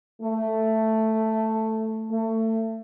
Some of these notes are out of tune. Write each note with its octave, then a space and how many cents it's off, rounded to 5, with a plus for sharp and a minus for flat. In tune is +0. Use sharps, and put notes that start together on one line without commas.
A3 +5
A3 +25